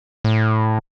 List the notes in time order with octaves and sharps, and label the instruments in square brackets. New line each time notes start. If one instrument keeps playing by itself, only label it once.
[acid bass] A2